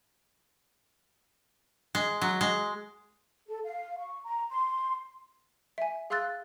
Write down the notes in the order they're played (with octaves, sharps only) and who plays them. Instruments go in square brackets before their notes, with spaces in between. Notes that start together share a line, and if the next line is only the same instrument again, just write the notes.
[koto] G#3
F#3
G#3
[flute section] A4
F5
C#6
A#5
C6
[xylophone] E5 G#5
G#4 F5 C6 E6 F#6 A6